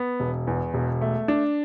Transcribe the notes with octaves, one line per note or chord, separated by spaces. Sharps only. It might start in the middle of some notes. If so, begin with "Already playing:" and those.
Already playing: B3
E1
E2
E1
A3
D4